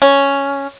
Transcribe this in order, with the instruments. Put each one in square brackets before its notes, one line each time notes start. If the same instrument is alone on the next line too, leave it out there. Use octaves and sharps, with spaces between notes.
[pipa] C#4